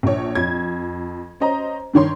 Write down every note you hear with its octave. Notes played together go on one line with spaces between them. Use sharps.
A#1 C#5
F2 G#6
C#4 C5 D#5 A#5
G2 D#3 C#5 C6